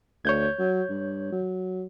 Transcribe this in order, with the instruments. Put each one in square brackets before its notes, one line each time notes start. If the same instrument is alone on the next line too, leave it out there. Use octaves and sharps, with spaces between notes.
[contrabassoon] D2 [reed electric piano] C#5 G6 G#6
[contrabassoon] F#3
G2
F#3